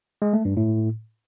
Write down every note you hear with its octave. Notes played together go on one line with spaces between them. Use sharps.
G#3
A3
G2
A2